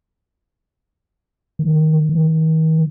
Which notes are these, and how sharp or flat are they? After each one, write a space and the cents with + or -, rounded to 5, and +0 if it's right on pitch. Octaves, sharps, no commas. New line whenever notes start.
D#3 +10
D#3 +40